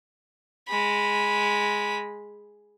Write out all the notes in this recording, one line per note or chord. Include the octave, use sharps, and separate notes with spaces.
G#3 B5